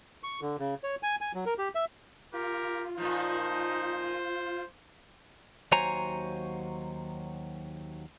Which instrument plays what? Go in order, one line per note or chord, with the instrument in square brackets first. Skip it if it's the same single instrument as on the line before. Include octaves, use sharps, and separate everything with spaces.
[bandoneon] C#6
D3
C#3
C#5
G#5
G#5
F#3
A#4
G4
E5
[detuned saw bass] F4 [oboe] G4 [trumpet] A#4
[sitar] A#2 F3 [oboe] D#4 [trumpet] C5
[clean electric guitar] D#2 F#3 C5 C#5 G#5 A#5